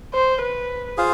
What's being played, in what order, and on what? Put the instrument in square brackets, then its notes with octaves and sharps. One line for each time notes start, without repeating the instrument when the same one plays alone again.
[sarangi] C5
B4
[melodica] F4 G#4 C5 F5